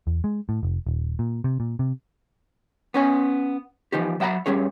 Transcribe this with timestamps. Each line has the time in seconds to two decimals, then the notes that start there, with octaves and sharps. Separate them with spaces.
0.07 E2
0.24 G#3
0.49 A2
0.63 F1
0.87 D#1
1.19 A#2
1.44 C3
1.60 A#2
1.79 C3
2.94 B3 C#4 G#5
3.92 E3 F3 D#4 G4
4.20 F#3 E5 F#5 G5 A#5 B5
4.46 G2 G3 C#4 G#4 C#5